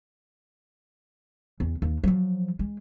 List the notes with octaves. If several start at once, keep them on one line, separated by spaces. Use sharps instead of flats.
E2
D#2
F3 F#3
G#3